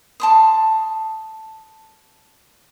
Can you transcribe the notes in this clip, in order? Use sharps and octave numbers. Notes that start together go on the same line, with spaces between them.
A5 C6 D#6